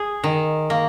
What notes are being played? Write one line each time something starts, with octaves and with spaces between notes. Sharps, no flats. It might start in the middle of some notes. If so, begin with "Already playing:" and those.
Already playing: G#4
D#3
A#3